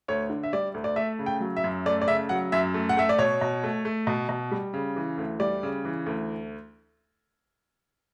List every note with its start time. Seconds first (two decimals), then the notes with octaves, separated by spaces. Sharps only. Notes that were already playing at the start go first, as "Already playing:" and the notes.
0.08 D2 C#5
0.30 D3
0.43 E5
0.53 G3 D5
0.74 D2
0.84 D5
0.96 A3 E5
1.19 C#3
1.26 G5
1.41 F#3
1.57 E5
1.64 F#2
1.86 A3 D5
2.02 D5
2.07 C#3 E5
2.29 F#3 F#5
2.52 F#2 E5
2.74 A3
2.89 F#5
2.97 A3 E5
3.09 D5
3.19 B2 C#5
3.41 B2
3.64 A3
3.85 A3
4.07 B2
4.29 B2
4.51 G3
4.74 C#3
4.96 E3
5.18 D2
5.40 G3 D5
5.63 C#3
5.85 E3
6.06 D2